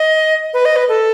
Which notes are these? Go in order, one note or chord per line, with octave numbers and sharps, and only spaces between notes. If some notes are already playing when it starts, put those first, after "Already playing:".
Already playing: D#5
B4
D#5
B4
A4